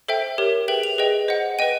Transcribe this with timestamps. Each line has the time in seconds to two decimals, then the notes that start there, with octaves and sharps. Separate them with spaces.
0.08 A4 C5 E5 G5
0.38 G4 A#4 C#5
0.68 G#4 B4 E5 G5 F#7
0.83 F7
0.98 G#4 B4 D#5 G5
1.28 C5 D#5 F#5
1.59 B4 D#5 G5 D#7